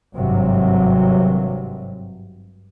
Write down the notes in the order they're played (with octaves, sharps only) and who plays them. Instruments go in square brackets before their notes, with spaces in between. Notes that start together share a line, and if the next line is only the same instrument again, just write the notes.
[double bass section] G#1 G2 C3 F#3